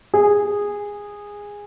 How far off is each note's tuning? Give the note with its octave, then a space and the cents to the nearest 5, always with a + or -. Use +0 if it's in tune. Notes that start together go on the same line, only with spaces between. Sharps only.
G#4 -15